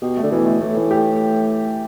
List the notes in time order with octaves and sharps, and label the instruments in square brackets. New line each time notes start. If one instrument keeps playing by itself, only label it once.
[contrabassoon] B2 [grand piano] G4
[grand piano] A3
[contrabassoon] D3
[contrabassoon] B2 [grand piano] E3
[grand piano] A3
[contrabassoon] A2 [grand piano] A3
[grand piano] E3
G4